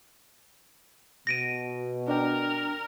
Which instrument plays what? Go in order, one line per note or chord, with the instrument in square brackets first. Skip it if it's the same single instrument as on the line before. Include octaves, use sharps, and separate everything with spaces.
[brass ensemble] B2 [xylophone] A#6 D7 D#7
[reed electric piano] D4 D5 G5 [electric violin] A#4